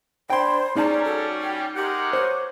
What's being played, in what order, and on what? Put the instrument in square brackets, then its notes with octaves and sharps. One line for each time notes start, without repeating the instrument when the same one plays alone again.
[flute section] D4 B5 G#6 [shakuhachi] C5 [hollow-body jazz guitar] G5 C6
[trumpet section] G3 C#4 [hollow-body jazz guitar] D#4 D5 A5 [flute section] G#4 [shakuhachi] A#5
[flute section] F#4 [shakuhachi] A4
[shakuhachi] G5
[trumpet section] G#3 A#4 F#5 [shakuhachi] G4 [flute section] D6 G6
[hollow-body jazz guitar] C5 [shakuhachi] C#5